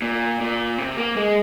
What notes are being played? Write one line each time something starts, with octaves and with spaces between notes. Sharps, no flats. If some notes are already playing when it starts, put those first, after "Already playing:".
A#2
A#2
C3
A#3
G#3